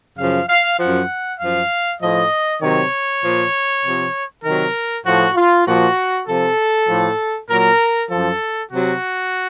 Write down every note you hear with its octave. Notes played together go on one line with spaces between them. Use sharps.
F#2 C#3 F3 F5
F5
F#2 F3 F#5
F#2 F3 F5
A2 F3 D#5
C3 D#3 F#3 C#5
A#2 F3
C3 F3
C3 D#3 F#3 A#4
A2 F3 F#4
F4
A#2 F3 F#4
C3 F3 A4
A2 F3
A#2 F#3 A#4
F#2 F3 A4
C3 F#3 F#4